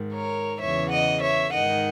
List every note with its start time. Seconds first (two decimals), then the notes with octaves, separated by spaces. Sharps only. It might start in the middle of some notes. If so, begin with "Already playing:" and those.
Already playing: G#2 D#3
0.13 A#4 C#5
0.60 E2 C#3 E3 C#5 E5
0.91 D#5 F#5
1.22 C#5 E5
1.53 G#2 D#3 D#5 F#5